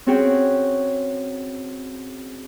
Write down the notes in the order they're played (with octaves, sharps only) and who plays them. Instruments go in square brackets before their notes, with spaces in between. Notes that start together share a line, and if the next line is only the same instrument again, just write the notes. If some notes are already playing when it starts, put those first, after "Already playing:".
[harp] C4 C#4 F#4 G#4 C#5 G5